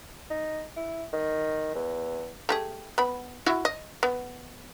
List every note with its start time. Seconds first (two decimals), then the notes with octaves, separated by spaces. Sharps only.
0.30 D#4
0.77 E4
1.13 D#3
1.75 E2
2.49 A3 G4 G#4
2.98 B3 B5
3.46 E4 F#4 E5
3.65 D#5
4.03 B3